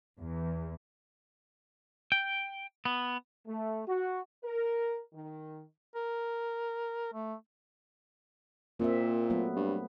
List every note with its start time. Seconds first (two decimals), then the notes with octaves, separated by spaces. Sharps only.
0.19 E2
2.12 G5
2.85 B3
3.47 A3
3.87 F#4
4.43 A#4
5.13 D#3
5.95 A#4
7.13 A3
8.80 A#2 A#3 C4 E5
9.30 F#3 A3 B3
9.56 G2